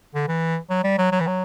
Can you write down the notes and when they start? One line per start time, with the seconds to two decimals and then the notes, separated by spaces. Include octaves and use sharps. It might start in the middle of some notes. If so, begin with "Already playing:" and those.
0.15 D3
0.28 E3
0.70 F#3
0.84 G3
0.98 F#3
1.12 F#3
1.20 E3
1.27 F#3